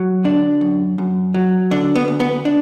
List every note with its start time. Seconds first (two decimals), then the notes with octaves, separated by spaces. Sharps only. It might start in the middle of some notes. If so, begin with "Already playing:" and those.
Already playing: F#3
0.24 D3 D4
0.61 F#2
0.98 F#2
1.34 F#3
1.71 D3 D4
1.95 B3
2.08 D2
2.20 B3
2.45 D4